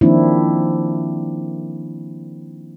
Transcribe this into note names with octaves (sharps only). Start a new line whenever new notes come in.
D#3 F3 A#3 C4 D4 E4